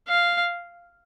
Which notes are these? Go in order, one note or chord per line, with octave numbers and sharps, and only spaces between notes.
F5